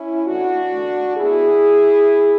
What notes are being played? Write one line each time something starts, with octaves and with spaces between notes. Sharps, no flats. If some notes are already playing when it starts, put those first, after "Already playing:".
Already playing: C#4 E4
A2 E3 A3 D4 F#4
E2 D3 A3
B2 G#3 B3 E4 G#4